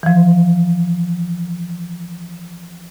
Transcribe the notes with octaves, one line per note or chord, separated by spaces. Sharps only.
E3 F3